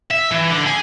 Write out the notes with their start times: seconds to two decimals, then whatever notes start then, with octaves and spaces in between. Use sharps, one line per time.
0.11 E5
0.31 E3
0.50 D3
0.67 G#4